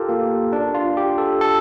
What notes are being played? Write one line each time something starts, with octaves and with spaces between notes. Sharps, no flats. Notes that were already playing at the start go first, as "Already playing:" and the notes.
Already playing: F4 G4 A4 A#4
A#3
D4
F4
G4
A4
A4